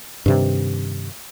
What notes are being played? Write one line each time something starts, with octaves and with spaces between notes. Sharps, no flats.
G2 C3 D#3